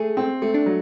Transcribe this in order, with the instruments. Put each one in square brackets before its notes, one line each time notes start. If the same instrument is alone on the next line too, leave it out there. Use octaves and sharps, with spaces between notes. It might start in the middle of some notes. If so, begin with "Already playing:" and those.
Already playing: [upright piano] A3 [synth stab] G4 G#4
[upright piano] C4
A3
[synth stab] D4
[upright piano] F#3